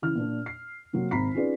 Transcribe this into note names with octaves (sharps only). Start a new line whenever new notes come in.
C#3 E3 E4 F6
A#2 D4
C7
C3 F#3 A#3 C4
G#1 A#5 B5 B6 C7
C#4 D#4 F4 G#4 B4 D5